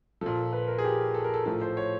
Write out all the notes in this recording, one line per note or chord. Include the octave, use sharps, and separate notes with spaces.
A#2 F3 A4
B4
A#4
G#4
G4
A4
A#4
A4
A2 F3 A4
C5
C#5